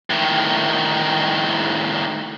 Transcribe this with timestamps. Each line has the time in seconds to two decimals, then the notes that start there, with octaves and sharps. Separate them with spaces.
0.10 A2 D#3